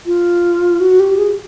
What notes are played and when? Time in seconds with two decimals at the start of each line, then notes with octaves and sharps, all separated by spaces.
0.06 F4
0.80 F#4
1.00 G4
1.18 G#4